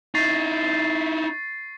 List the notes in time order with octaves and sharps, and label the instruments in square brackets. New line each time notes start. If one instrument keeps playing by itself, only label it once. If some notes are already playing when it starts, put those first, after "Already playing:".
[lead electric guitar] D#4 E4 [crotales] C#6 A6 C7